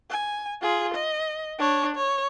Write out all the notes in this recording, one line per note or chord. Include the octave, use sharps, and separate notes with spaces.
G#5
F4 G#4
D#5
D4 C#5
C#5